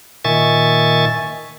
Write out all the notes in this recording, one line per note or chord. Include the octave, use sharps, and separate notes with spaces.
A#2 D#3 E5 G#5 C#6 A6